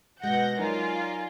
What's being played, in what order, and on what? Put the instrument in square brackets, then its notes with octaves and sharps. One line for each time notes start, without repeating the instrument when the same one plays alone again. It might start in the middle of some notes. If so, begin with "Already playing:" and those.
[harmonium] B2 [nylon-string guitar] G#3 [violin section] F#5 G6 A#6
[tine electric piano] F#3 D#4 [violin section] F4 D5 [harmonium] A#4 G#5